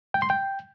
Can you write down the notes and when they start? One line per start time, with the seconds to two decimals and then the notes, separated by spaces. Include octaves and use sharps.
0.14 G5
0.22 C6
0.30 G5